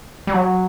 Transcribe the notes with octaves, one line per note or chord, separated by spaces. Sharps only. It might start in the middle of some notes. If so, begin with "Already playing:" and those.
G3
F#3